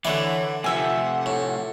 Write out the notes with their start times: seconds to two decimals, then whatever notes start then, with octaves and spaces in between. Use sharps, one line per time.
0.05 D3 E3 E4 C#5 D5 F#5
0.64 C3 F3 A4 E5 F#5 G#5
1.26 A2